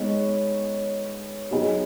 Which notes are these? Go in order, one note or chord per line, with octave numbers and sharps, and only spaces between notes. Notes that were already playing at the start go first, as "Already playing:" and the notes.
Already playing: G#3 B3 D#4 C#5
F#3 B3 D#4 G#4